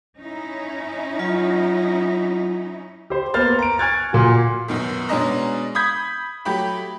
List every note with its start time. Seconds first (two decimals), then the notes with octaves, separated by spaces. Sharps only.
0.17 C#4 D#4 E4
1.19 F#3 F4
3.10 G4 C5
3.34 A#3 B3 C5 F6 A6
3.59 A#5 D7
3.79 G#5 C#6 F6 F#6 G#6 A6
4.13 A#2 F#4
4.68 F#2 B2 D#3
5.09 B2 G#3 C#4 D4 D#5 A#5
5.75 B5 D#6 G6 G#6 B6
6.45 F#3 A3 G4 G5 B5